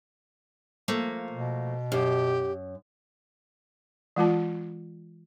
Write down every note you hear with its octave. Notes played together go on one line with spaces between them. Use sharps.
F3 A3 A#3
B2
F#2 G4
E3 G#3 F4 A5